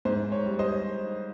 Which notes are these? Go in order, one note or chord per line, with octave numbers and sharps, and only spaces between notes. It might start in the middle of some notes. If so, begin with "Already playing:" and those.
G#2 C5
C#5
G3
C5 D#5